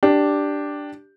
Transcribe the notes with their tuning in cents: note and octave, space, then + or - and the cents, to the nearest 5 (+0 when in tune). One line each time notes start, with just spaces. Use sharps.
D4 +0 G4 +0